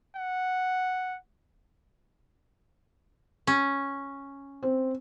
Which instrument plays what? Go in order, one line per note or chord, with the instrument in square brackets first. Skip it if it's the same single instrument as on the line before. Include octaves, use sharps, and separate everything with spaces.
[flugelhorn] F#5
[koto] C#4
[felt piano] C4